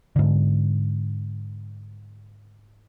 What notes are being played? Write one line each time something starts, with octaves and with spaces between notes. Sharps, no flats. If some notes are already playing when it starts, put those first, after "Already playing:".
G#2 D3